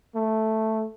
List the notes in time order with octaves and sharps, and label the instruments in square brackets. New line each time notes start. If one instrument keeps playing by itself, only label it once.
[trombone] A3